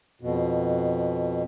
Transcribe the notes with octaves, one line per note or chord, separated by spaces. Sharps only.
F2 B2